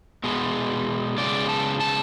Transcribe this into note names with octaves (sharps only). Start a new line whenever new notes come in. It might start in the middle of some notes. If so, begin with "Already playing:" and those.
B2 G#3 B3
C#3 G#3 B3 D5
A5
A5